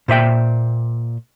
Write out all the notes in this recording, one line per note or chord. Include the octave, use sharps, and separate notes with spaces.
A#2 C5 E5 G5